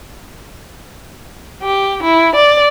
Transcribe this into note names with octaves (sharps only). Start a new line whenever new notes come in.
G4
E4
D5